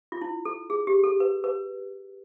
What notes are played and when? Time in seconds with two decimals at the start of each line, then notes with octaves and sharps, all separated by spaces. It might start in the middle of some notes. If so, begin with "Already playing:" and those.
0.12 F4
0.22 E4
0.45 A4
0.70 G#4
0.87 G4
1.04 A4
1.20 B4
1.44 B4